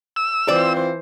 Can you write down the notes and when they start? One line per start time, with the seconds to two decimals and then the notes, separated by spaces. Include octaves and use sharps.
0.16 E6
0.48 E3 C4 F4 C5 D5